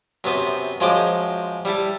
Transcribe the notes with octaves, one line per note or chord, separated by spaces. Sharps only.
F#2 C3 B3 B4 C5
F#2 F3 G#3 C5 G5 D6
G3 E4 A5